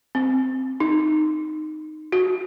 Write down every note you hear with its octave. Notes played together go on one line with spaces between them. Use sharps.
C4
D#4
F#4